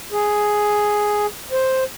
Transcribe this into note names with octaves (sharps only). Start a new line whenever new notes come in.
G#4
C5